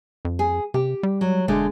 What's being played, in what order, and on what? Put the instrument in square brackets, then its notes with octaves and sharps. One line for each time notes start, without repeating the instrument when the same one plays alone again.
[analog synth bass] F2
[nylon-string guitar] G#4
[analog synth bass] C3 [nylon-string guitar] G4
[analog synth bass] G3
[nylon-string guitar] F#3
[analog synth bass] E1 [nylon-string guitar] D3 G#3 A3